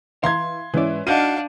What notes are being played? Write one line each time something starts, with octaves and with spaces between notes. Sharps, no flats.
E3 F5 A#5 C6 G#6
G#2 E3 C#4 E4 D5
D4 D#4 F#4 F5 F#5 G6 D#7